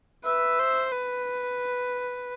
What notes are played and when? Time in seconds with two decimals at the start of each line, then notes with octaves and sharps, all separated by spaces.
0.25 B4 E5
0.59 C5
0.92 B4